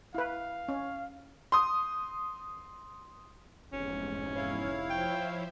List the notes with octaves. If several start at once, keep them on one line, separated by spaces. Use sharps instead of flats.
E4 B4 F5
C#4
C6 D#6
F1 E2 G#2 C#4
E4 C#5 F5
F3 C5 E5 G5